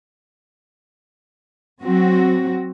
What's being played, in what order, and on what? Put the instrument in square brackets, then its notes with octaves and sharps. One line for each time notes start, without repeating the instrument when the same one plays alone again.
[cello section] F#3 C4 F#4